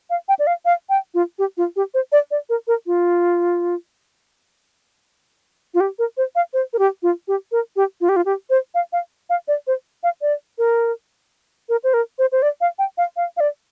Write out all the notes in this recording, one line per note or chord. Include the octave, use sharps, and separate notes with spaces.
F5
G5
D5
F5
F5
G5
F4
G4
F4
G4
C5
D5
D5
A#4
A#4
F4
F4
G4
A#4
C5
F5
C5
A#4
G4
F4
G4
A#4
G4
F4
G4
F4
G4
C5
F5
F5
F5
D5
C5
F5
D5
A#4
A#4
C5
A#4
C5
C5
D5
F5
G5
F5
F5
F5
D5